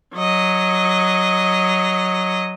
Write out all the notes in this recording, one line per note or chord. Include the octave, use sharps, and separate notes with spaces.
F#3 D#5